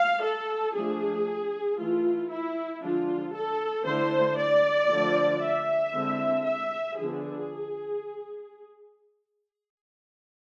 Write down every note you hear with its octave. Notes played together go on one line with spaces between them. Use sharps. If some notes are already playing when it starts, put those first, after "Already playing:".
Already playing: F5
A4
F3 A3 D4 G#4
E3 A3 E4 F4
E4
D3 F3 G#3 D4 F4
A4
D3 A3 E4 C5
D5
D3 F3 A3
E5
D3 G#3 C4 E4
E5
D3 F3 B3 D4 G#4